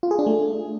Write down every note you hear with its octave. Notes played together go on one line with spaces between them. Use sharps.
F4
G#4
D4
A3